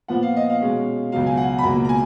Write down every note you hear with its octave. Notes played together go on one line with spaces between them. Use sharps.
A#2 F3 B3 F#5
F5
D#5
F5
B2 G#3 C#4
C#2 B2 F#3 F5
G#5
F#5
B5
C#2 B2 A#3 A#5
A#5
G#5